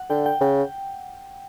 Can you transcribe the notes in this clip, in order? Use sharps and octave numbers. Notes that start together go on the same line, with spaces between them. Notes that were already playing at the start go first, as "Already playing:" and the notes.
Already playing: F#5
D3 G5
G5
C#3 G5